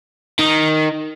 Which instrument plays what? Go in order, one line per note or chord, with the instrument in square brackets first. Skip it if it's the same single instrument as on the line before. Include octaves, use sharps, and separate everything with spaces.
[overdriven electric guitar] D#3